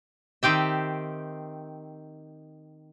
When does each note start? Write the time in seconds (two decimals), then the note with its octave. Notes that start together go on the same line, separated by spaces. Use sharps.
0.43 D#3 C4 G4 E5